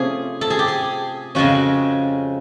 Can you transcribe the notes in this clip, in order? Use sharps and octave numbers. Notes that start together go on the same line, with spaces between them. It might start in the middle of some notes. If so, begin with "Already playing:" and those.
Already playing: C3 F3 A3 C#4 G#4
A4
G#4
G4
G#4
F2 C#3 F3 G#3 C#4 F#4